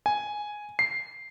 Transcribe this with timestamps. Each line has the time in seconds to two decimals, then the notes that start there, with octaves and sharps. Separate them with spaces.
0.06 G#5
0.79 C7